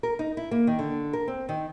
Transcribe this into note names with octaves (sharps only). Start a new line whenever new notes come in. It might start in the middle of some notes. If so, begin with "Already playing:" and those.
A#4
D#4
E4
A#3
D#3
D3
A#4
C4
D#3